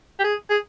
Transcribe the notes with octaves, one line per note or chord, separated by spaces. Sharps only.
G4
G#4
G#4